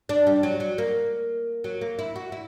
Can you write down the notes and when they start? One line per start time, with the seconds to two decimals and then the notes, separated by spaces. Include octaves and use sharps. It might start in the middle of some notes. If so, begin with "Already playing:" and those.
0.09 D4
0.27 G3
0.43 F#3
0.60 F#3
0.78 A#3
1.64 F#3
1.81 A#3
1.99 E4
2.16 F#4
2.32 E4